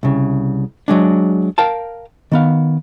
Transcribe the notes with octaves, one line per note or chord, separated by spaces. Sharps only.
C2 C#3
F#3 G#3 D4
A#4 F5 G5 A5
D#3 B3 F5